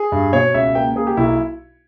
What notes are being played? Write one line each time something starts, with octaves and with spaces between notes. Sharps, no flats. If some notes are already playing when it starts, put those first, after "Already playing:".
Already playing: G#4
G2
B2 C#5
C#2 E5
A#3 G5
A#3 G#4
G4
B1 E4